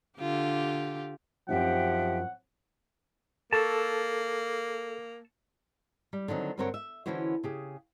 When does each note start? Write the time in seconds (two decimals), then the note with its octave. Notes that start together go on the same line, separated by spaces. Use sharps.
0.18 D3 F4 G4
1.49 F#2 F3 C4 D#4 G4 E5 F#5 G5
3.53 A#3 A4 A5 C#6 E6
6.13 G3
6.28 D3 D#3 F#3 C4
6.58 G2 D3 C4 A#4 C#5 F#5
6.74 E5
7.06 D3 E3 C#4 E4 F#4 C5
7.44 C#3 G4 G#4